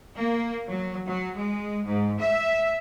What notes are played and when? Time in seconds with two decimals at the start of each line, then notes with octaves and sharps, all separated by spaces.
0.18 A#3
0.69 F#3
1.07 F#3
1.37 G#3
1.85 G#2
2.20 E5